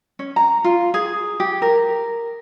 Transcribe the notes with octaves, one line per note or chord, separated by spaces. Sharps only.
C#4
A#5
F4
G#4
G4
A#4